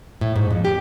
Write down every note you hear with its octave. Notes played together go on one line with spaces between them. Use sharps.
A2
G#2
F2
G4